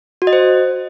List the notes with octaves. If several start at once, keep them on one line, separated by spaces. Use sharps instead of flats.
F#4
D#5
C5